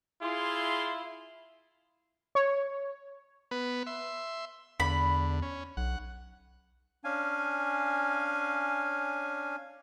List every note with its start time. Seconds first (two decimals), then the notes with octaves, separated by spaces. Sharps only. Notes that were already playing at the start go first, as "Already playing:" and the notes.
0.22 E4 F4 G#4 C6
2.35 C#5
3.51 B3 B4
3.87 E5 C6
4.80 E2 D3 B5
5.42 C#4
5.77 B1 F#5
7.04 C#4 D4 F5 G#5